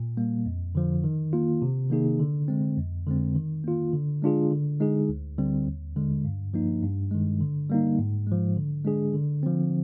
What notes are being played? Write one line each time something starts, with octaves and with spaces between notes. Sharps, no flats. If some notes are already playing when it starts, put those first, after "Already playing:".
Already playing: A#2
G3 A#3
F2
D3 F3
D#3
A#3 F4
C3
D#3 A#3 D#4 G#4
D3
G#3 C4
F2
D3 G#3 C4
D#3
A#3 F4
D3
G#3 D4 F4 G#4
D3
G#3 D#4 G#4
D2
D3 G3 C4
D#2
D3 G#3
G2
F3 A#3 D#4
G2
D#3 G#3
D3
G3 A#3 D#4
G#2
F3 G#3
D3
G#3 D4 G#4
D3
F3 C4